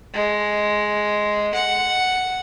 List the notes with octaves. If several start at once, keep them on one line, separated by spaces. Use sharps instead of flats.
G#3
F#5